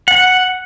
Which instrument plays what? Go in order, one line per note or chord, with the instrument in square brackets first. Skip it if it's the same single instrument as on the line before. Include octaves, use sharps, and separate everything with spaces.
[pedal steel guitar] F#5